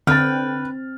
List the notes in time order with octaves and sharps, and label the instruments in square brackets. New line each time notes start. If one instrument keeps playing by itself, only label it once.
[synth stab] D3 [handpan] C4 [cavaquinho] B4 G5 [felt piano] F6 A6